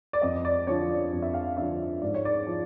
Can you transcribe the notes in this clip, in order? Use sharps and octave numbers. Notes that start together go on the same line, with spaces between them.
D5
F2 D#5
D5
D3 F3 C#5
D5
F2
E5
F5
D3 F3 E5
G#2 D5
C#5
D5
F3